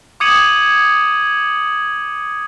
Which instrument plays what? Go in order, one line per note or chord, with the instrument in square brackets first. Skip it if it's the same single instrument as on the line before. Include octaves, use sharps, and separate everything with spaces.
[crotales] D6 D#6 G#6 C#7 D#7 F#7